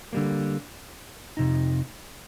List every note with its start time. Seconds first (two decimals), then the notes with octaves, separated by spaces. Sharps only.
0.13 D3 G3 A#3
1.37 F2 C3 D#4